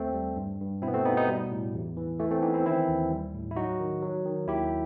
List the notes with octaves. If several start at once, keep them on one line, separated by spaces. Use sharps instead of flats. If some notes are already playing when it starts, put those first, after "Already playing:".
Already playing: D#2 A3 C4
G3
G2
G2
B2 C4 E4
B3
A3 C4
B2 B3 D#4
B3 D#4
G3
A2
E2
E3
E3 A3
A3 C4
E3 B3 D#4
C4 E4
D#3 C4 E4
D#2
G3
A2
E4
F#3 D#4 F#4
D#3
F#3
D#3
D#2 E4 G4